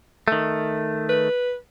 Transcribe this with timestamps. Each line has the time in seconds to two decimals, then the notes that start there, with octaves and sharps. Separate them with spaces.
0.28 D#3 A3
1.09 B4